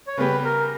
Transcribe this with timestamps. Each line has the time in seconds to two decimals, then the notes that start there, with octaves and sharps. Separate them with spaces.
0.07 C#5
0.17 C#3 G3 B3 G4 B4
0.44 A#4